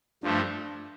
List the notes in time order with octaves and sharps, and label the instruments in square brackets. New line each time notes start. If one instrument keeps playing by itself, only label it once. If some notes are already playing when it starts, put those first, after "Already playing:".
[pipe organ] G2 F3 A3 [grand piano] D4